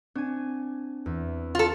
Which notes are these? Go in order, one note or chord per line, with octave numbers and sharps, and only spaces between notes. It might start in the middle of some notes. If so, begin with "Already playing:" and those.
C4 D4 G#5
E2
F4 A4